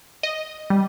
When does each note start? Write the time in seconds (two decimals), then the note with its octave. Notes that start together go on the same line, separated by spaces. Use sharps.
0.23 D#5
0.70 G3